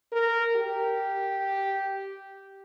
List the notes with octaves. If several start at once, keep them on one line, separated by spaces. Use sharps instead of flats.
A#4
G4